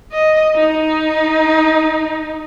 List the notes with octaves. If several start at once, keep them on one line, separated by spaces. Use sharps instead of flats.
D#5
D#4